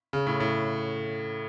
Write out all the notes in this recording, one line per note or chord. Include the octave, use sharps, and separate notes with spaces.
C#3
A2
A2